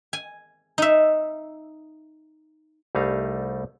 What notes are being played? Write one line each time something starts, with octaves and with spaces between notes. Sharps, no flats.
G#5
D#4 E5
C2 G3 A3 D#4 F5